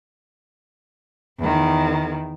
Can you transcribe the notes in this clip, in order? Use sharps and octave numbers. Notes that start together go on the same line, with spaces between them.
E2 D#3